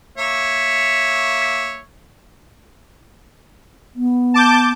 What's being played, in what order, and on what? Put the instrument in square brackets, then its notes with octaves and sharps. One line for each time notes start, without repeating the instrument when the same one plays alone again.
[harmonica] A#3 C#5 E5
[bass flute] B3
[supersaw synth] A5 D6 G6